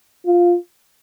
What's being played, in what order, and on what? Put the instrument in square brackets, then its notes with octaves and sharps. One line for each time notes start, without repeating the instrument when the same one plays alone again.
[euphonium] F4